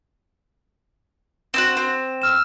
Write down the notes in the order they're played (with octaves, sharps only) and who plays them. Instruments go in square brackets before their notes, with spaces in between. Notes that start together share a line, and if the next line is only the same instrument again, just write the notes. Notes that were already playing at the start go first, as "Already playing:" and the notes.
[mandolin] C4 E4 F#4 [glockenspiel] E7
[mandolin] C4
[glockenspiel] E6 F6 E7